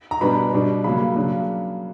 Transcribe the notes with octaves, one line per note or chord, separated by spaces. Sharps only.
A#5
B2 G3 B3 D4 B5
B2 G3 B3 D4
C#3 F#3 A#3 B5
C#3 F#3 A#3 D4